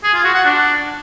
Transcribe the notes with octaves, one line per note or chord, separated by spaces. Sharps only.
G#4
F4
F#4
F#5
D4